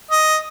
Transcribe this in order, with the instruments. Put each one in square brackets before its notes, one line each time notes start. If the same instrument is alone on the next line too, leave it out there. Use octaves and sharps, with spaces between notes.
[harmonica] D#5